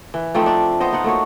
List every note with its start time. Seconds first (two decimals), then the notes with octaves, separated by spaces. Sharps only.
0.14 E3
0.34 F3 A3 C4 D#4
0.46 D4
0.80 B3 C5 D#5
0.93 D#4 F4 F#5
1.04 A3 A#3 F#4 C#5